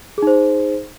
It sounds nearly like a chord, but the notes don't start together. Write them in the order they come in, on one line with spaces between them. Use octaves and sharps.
G#4 D#4 C5